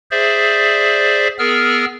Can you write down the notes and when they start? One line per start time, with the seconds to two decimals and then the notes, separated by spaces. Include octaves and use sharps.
0.11 G#4 C5 D5 E5
1.39 B3 G#4 A#4 E6 F6